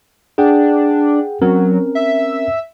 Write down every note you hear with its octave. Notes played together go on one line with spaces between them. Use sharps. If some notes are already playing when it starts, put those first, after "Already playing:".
D4 G#4 F#5 G5
F#3 C4 C#4 A#4
E5